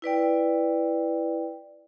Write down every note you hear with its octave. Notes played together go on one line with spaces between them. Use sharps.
E4 B4 D5 G5